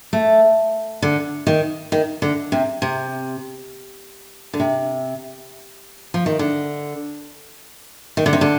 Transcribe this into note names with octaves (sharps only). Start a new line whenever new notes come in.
A3
D3
D#3
D#3
D3
C3
C3
D3
C3
F3
D#3
D3
D#3
D3
C3
D3